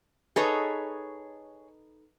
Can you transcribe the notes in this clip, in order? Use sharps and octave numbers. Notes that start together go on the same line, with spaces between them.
D#4 G#4 A4 B4 C#5